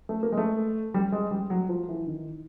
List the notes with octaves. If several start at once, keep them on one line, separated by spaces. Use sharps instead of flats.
A3
A#3
G#3
A3
G3
G#3
G3
F#3
F3
E3
D#3